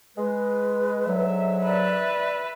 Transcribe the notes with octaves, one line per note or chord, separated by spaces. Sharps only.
G#3 B4
G#2 D3 F#3 E5
B4 D5 E5